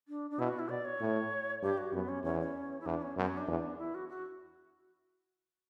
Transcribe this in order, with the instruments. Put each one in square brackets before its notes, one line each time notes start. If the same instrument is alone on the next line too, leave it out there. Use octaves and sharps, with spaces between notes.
[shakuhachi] D4
D4
[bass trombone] B2 [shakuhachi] E4
[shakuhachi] F#4
E4
[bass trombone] B2 [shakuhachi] D5
[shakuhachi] C#5
[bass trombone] A2
[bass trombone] G2 [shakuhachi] G4
[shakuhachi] F#4
[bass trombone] F#2 [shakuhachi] B3
[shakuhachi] C#4
[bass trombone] E2 [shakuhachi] C#4
[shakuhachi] C#4
E4
[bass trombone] E2 [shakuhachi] D4
[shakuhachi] C#4
[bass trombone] F#2 [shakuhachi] B3
[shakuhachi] C#4
D4
[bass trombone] E2
[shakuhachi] E4
F#4
F#4